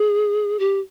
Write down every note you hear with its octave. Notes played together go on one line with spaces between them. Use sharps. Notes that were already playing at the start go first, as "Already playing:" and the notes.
Already playing: G#4
G4